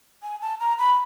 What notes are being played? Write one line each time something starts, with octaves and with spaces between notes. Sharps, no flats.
G#5
A5
A#5
B5